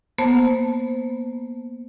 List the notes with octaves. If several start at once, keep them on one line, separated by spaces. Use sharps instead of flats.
A#3 B3 C5 A5